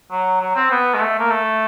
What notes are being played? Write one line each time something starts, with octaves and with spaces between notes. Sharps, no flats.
F#3
F#3
C4
B3
G#3
A3
A#3
A3